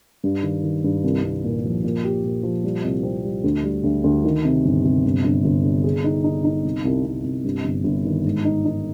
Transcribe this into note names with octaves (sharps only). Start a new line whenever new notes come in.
G2
D#3
D#3
G2
C2
C2
A#2
F3
A#2
G4
A#2
F3
G3
C2
C4
G3
D2
G3
D2
D2
D#3
C3
G1
C3
G1
G1
G1
D3
G#4
D#4
D#4
D#4
C2
C2
C2
C2
G2
G1
G1
D#3
G#2
D#4
D#4